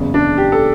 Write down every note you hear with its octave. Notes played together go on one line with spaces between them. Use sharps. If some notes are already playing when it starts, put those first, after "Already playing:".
Already playing: F#1 E2 C#3
D4
G4
A4